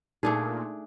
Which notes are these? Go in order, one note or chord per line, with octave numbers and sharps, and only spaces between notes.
A#2 A3 D4 D#4 G#4